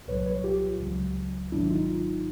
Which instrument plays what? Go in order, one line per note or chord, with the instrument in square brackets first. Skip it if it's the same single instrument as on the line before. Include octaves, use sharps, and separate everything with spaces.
[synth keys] C2 A#2 F#3 B4 C#5
B4 C#5
F4 G4
C#2 C#3 F#3
G#1 G#2 D#3 F#3 D4 E4
D#4 F4